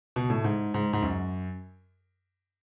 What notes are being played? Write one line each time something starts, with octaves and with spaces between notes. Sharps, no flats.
B2
A2
G#2
G#2
G#2
F#2